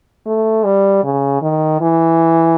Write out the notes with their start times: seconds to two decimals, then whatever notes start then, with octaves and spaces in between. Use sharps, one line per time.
0.26 A3
0.64 G3
1.04 C#3
1.42 D#3
1.81 E3